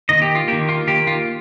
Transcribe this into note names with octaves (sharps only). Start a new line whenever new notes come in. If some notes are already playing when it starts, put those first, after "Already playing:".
D#3 A#3 D#5
G4
F4
D#3 A#3 G4
F4
D#3 A#3 G4
F4